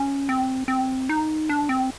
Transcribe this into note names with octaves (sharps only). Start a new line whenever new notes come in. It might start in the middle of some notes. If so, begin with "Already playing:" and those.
Already playing: C#4
C4
C4
D#4
D4
C4